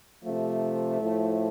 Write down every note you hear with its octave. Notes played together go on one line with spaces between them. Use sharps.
C3 F3 A3
A2 F3